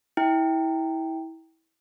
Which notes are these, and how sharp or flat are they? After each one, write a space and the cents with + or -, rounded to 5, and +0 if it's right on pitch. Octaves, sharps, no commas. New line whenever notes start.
E4 -25 G5 +0